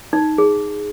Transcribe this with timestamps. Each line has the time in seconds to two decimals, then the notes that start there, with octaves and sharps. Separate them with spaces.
0.13 D#4
0.38 G#4